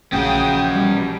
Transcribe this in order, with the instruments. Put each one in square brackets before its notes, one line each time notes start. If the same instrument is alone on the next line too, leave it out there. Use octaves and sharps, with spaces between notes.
[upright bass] A#1 E3 [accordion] C#3 G5 D#6 [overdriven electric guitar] C#4 F#4
[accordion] B2 [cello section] G3